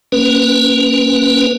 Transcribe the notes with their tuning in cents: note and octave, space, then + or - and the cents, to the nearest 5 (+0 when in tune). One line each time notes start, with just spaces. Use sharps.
A#3 +0 C#4 +0 B4 -5